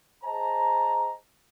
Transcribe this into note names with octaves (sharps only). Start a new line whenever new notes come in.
G#4 C5 D#5 A5 A#5